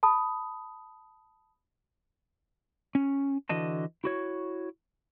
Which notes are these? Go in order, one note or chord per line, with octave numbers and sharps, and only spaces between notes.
A5 B5 D#6
C#4
D3 E3 F#4 D#5 A5
E4 F#4 C#5